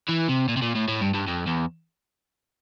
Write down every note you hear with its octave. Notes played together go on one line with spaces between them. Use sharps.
E3
C3
A#2
C3
A#2
A2
A2
G2
G2
F2
E2